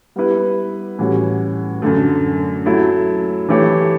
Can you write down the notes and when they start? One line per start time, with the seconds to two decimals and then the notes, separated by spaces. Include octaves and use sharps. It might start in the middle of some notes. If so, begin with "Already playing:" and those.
0.16 G3 B3 E4 B4
0.99 A2 E3 G3 C#4 F#4
1.82 F#2 D3 A3
2.66 F#3 A3 E4
3.49 E3 A3 E4 G4 C#5